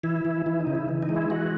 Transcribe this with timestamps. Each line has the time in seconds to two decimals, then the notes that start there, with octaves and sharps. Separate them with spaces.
0.04 E3 E4
0.25 E3
0.46 E3 E4
0.61 D#4
0.67 C#3
0.75 E4
0.89 E3
1.03 D#4
1.09 G#3
1.16 E4
1.30 E3 F#4